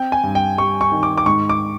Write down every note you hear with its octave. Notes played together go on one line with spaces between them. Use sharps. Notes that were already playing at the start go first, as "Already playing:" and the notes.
Already playing: C4 G5
G#5
G2
G5
G3 C#6
C#6
D#3
D6
D6
G#2 C#6
D6